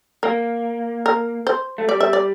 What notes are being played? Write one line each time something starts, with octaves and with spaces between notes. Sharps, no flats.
A#3 A#4
A#4
C5
A3
G3 D5
E5
D5